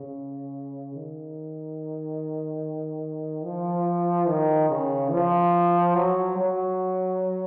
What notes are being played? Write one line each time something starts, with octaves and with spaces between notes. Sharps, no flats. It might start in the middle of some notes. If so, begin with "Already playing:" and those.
Already playing: C#3
D#3
F3
D#3
C#3
F3
F#3
F#3